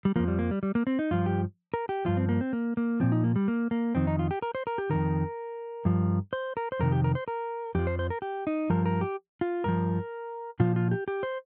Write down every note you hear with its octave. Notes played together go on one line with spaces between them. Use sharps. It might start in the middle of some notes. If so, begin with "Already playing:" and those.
G3
F2 F3 A#3
G3
A#3
G3
G3
A#3
C4
D#4
G2 F3 F4
G4
A#4
G4
G2 F3 F4
C4
A#3
C4
A#3
A#3
A#2 F3 C4
D#4
A#3
G3
A#3
A#3
F2 D#3 C4
D#4
F4
G4
A#4
C5
A#4
G4
F2 C3 D#3 A#4
G2 F3
C5
A#4
C5
F2 C3 D#3 A#4
G4
A#4
C5
A#4
F2 F3 G4
C5
C5
A#4
G4
D#4
G2 F3 A#4
A#4
G4
F4
G2 F3 A#4
A#2 F3 F4
F4
G4
G4
C5